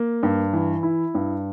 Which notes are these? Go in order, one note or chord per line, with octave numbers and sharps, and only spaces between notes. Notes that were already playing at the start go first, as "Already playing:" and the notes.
Already playing: A#3
G2
E3
E4
G2